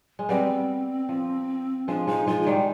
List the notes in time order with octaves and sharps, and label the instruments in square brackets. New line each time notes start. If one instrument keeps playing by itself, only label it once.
[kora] G#3
[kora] G3 B3 [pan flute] C4
[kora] F3
[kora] F3 G#3 [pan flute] D4
[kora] F3 G#3 [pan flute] D#4
[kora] F3 G#3 [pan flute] F4
[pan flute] F4
[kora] D#3 G3 [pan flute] D#4